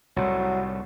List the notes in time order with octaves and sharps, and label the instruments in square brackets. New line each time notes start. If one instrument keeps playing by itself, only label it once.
[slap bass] C2 A2 [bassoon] F#3